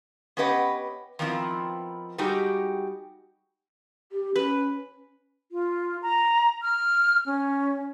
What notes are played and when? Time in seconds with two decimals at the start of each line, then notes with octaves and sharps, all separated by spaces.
0.37 B3 C#4 G4 B4 D#5 F#5
1.19 D#3 F3 B3 C4 E4 F4
2.18 G3 G#3 D#4 F#4 G4
4.12 G4
4.36 C#4 B4
5.52 F4
6.02 A#5
6.62 F6
7.26 C#4